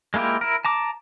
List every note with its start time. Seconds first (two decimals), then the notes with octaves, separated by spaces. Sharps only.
0.14 G#3 A#3 E4 F4 G4
0.41 E4 A#4
0.65 A5 A#5 D6